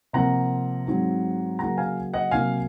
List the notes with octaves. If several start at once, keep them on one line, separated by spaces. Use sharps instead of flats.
C3 F3 A#3 F#5 A#5
G#2 F#3 C4
C#3 F#3 A#3 F#5 A#5
F5 G#5
D#5 F#5
C3 F#3 A#3 F5 G#5